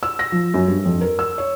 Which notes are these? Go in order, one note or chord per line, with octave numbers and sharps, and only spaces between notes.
E6
A#6
F3
F#2
G2
F2
A#4
E6
C#5